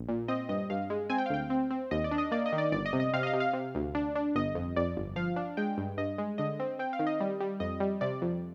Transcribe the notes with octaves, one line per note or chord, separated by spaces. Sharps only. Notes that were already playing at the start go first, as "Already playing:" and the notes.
Already playing: A#1
A#2
C4 D#5
G2 D#5
G2 F5
G#3
C4 G#5
G5
F5
D2 G5
C4
C4
D#2 D#5
D5
D4
D#5
A#3 D5
D#5
D#3
D5
G1 D5
D#5
C3
D#5
C3 F5
D#5
F5
C3
F5
C3
D2
D4
D4
G1 D#5
F2
F2 D5
G1
F3 F5
D4
G#3 G5
G2
G2 D#5
G#3
D3 D#5
C4
C4 G5
F5
D#3
D#5
G3
G3
F2 D#5
G3
C3 D5
F2